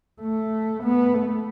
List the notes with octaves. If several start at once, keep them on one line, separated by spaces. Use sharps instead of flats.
A3
B3
A3